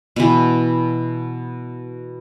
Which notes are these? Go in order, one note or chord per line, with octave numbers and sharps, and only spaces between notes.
B2 E3